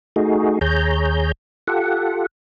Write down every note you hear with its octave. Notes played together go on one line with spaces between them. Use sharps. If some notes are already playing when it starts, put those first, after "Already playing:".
A3 D#4 F#4 G#4
D#2 G#4 C#5 A#5 G6
F4 G4 A4 F#5